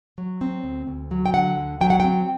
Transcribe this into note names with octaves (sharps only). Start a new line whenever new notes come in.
F#3
C4
D2
D2
F#3
G5
D3 F#5
D2
F#3 G5
F#5
C4 G5